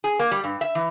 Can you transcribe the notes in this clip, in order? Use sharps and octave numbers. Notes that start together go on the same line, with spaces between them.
G#4
A#3
G3
G2
E5
E3